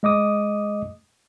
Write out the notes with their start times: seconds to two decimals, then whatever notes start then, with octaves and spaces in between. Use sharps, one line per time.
0.03 G#3 D#5 D6 D#6